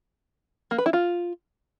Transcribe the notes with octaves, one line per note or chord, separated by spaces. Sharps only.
A#3
B4
E4
F4